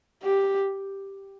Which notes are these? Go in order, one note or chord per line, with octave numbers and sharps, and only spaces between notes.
G4